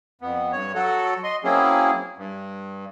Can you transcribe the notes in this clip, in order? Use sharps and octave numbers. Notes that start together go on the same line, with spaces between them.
F2 B3
G2 C#5
F#3 F#4 A4
D#5 C6
F#3 A#3 C4 C#4 E4 G#4
G2